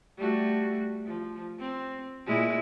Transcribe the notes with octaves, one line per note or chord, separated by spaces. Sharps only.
G3 A3 F#4
F3
C4
A#2 G#3 E4